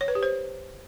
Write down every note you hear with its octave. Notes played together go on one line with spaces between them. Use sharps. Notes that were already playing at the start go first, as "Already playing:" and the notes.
C#5
B4
G4
C5